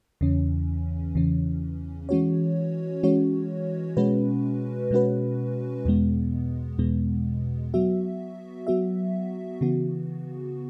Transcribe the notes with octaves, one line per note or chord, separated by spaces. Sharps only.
E2 C#3 E3 C#4
E2 C#3 E3 C#4
E3 G#3 C#4 F#4 C#5
E3 G#3 C#4 F#4 C#5
B2 G#3 C#4 F#4 B4
B2 G#3 C#4 F#4 B4
E2 B2 G#3 B3
E2 B2 G#3 B3
F#3 B3 F#4 E5
F#3 B3 F#4 E5
C#3 E3 B3 F#4